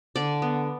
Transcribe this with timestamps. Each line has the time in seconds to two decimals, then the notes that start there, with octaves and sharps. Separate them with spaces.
0.16 D3 D5
0.42 B3